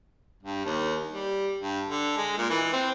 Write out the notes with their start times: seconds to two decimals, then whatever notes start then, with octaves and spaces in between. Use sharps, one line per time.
0.43 G2
0.65 D#2
1.13 G3
1.61 G2
1.89 D3
2.17 G#3
2.38 A#2
2.50 E3
2.73 C4